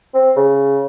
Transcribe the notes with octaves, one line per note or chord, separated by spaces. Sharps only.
C4
C#3